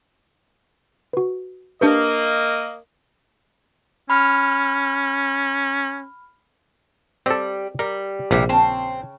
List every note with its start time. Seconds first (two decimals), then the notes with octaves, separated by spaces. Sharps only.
1.13 F#4 B4
1.81 A#3 D4 G4 B4 D#5
4.10 C#4 B5 F6
7.26 G3 C4 A4
7.79 G3 A#4
8.31 A#1 C3 G3 E4
8.49 C#3 C4 C#5 A5